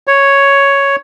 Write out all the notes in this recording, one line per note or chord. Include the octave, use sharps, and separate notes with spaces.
C#5